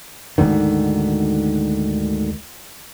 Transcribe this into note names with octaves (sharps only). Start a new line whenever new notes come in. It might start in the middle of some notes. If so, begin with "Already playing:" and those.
D2 G#2 D3 D#3